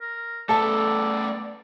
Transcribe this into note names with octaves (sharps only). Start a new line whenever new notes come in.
A#4
A3 B3 A4 D5 A5